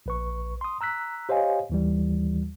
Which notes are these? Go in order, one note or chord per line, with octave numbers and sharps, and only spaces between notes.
A#1 B4 C#6
C6 D#6
A#5 E6 F#6 B6
G4 C5 C#5 D#5 F5 G#5
D#2 E3 G3